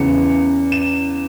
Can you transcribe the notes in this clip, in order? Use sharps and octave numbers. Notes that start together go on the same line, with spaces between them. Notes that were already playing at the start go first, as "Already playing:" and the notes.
Already playing: E2 C#3 E3 C#7
E7